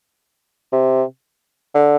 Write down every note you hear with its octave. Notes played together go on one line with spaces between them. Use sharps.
C3
D3